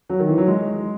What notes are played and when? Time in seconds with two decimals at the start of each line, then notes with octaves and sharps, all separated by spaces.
0.10 F#3
0.19 D#3
0.28 E3
0.38 F#3
0.48 G#3